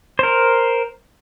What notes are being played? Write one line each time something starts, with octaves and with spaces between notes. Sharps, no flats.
A#4 C5